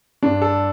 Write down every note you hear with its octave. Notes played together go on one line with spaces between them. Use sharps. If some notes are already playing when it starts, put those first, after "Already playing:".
G2 D4
A4